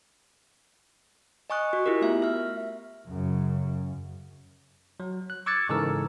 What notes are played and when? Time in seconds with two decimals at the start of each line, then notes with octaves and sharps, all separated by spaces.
1.50 D#5 G#5 C#6 D#6 F#6
1.73 F#4
1.86 E4 F4 G4 A#4
2.02 A3 B3 E5
2.22 E5 F6
3.07 F#2 C#3
5.00 F#3
5.30 F#6
5.46 C#6 D6 E6 G#6 A6 C#7
5.69 G#2 C#3 E3 A4 A#4 E6